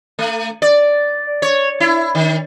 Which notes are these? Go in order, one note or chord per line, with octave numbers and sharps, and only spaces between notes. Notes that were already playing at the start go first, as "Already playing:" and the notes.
A3
D5
C#5
E4
D#3